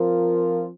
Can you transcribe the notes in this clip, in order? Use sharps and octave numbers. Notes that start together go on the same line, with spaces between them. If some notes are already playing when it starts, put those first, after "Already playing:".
Already playing: F3 C4 F4 A#4